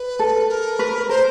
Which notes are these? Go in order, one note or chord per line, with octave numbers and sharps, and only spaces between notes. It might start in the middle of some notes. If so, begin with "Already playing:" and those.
Already playing: B4
A4
A#4
B4
A#4 C5